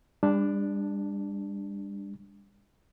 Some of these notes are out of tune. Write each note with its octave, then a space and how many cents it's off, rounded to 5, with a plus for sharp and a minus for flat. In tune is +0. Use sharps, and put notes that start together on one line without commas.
G3 +40 D4 +0